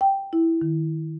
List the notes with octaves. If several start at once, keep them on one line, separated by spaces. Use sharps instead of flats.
G5
E4
D#3